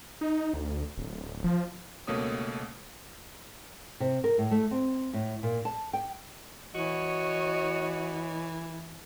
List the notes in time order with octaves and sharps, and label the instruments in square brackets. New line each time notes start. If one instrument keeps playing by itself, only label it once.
[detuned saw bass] D#4
D2
D1
F3
[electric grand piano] C#2 B2 A3 A#3 C#5 D#6
[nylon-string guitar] C3
A#4
A2
A3
C4
A2
A#2
A5
G5
[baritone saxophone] E3 [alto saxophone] F#4 [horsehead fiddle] C#5 D#5